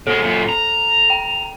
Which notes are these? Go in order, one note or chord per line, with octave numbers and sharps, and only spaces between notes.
B2 G#3 A4
F#2 A#2
A#5
G5